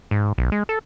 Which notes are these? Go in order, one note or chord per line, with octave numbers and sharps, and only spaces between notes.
G#2
B1
G#3
A4